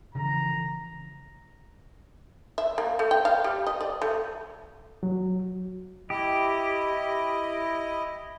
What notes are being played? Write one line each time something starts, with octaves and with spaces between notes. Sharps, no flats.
C#3 E3 F3 A#5
E5
A#3
A3
G5
F5
G3
D#5
D5
A3
F#3
E4 G4 D#5